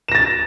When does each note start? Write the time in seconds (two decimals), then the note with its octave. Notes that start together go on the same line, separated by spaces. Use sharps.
0.08 E7
0.12 A#6
0.15 A6